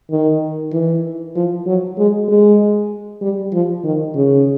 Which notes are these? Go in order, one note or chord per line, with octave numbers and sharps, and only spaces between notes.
D#3
E3
F3
F#3
G#3
G#3
G3
F3
D#3
C#3